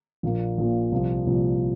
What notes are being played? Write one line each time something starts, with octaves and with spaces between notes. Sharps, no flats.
A#1 A#2 A#3
A#1 A#2 A#3
C2 A#2 F3
C2 A#2 F3